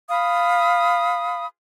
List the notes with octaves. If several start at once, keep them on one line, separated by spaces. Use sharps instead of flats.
F5 B5 D#6